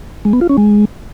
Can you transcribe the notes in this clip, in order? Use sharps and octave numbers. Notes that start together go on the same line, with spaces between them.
G#3
B3
F4
C#4
G#3